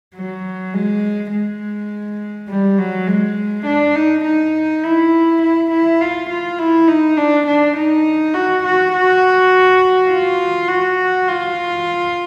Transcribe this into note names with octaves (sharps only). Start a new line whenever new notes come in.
F#3
G#3
G#3
G3
F#3
G#3
D4
D#4
D#4
E4
E4
E4
F4
F4
E4
D#4
D4
D4
D#4
F#4
F#4
F#4
F4
F#4
F4